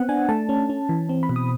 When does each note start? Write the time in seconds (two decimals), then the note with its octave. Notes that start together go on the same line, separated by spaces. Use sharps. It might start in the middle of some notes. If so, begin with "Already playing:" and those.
Already playing: B3 C4 F#5
0.09 D4 G#5
0.29 A3 A5
0.49 C#4
0.70 C#4
0.89 E3
1.09 C4
1.23 B5
1.29 B2
1.36 D#6